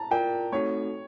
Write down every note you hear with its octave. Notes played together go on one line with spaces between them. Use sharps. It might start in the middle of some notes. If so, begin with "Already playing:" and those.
Already playing: A5 A#5
F4 A#4 D5 G5
A3 C4 D#4 F#4 A4 C#5